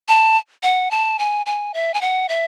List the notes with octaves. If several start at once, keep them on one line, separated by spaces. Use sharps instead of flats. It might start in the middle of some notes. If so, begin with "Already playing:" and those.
A5
F#5
A5
G#5
G#5
E5
G#5
F#5
E5